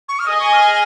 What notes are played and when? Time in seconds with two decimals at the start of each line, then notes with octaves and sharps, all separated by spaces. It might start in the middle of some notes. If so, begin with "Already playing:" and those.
0.08 C#6
0.19 F6
0.26 G#4 D#5 G#5 D#6
0.39 C#6
0.53 F6